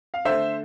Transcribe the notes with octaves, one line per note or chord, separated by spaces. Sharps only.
F5
D3 A3 C5 E5